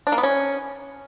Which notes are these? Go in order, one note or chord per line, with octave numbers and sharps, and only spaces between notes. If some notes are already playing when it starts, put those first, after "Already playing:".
D4
A#3
B3
C#4